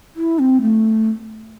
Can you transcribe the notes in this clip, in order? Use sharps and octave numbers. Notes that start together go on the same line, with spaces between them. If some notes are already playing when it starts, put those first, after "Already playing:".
E4
C4
A3